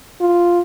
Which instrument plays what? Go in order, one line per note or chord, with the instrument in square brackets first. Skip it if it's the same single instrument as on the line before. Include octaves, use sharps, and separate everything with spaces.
[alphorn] F4